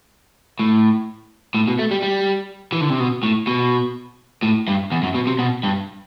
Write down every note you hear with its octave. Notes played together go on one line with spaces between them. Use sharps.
A2
A2
B2
A3
G3
G3
E3
D3
C3
B2
A2
B2
A2
G2
E2
F#2
B2
C3
B2
G2